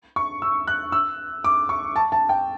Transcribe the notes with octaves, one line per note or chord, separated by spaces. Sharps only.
C#6
E6
F#6
E6
D6
C#6
A5
A5
G5